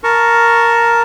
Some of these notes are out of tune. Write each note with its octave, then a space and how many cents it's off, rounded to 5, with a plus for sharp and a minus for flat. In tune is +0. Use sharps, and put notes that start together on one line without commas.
A#4 +0 A5 +0 C#6 +0